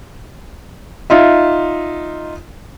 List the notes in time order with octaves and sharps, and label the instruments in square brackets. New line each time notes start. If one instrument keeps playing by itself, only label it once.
[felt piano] D#4 F4 E5